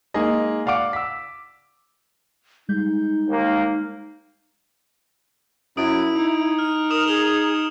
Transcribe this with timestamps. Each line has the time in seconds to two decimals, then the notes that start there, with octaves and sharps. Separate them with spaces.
0.14 G#3 A#3 D#4 G#4 D#5
0.66 D5 F5 F#5 D6 D7
0.93 E6 B6
2.69 G3 G#3 D#4 G6
3.28 D#2 A#3
5.77 F#2 E4 D#6 D7
6.15 D#4
6.59 F6
6.91 A#4 D#6 E7 F7
7.08 G#4 G7